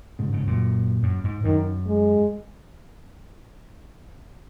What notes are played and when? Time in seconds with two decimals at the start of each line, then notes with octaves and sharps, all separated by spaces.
0.19 G#2 C#3
0.33 G#2 C#3
0.47 F#2 A#2
1.03 F#2
1.24 G#2
1.44 F#2 D#3
1.87 G#3